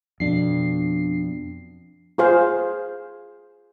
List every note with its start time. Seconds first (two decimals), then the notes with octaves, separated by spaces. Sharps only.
0.20 F2 B2 D4 C7
2.18 F4 G#4 C5 F5